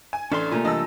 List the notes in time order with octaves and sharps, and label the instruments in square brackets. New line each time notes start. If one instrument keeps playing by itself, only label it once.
[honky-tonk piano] G#5
[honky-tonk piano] A1 [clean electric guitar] C#4 D4 C6 [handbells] A4 D5 F6
[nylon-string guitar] C3 A3 A#3 [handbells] F4 G#5 A#5
[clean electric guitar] E3 G3 D4 [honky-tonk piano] D#5 A5 E6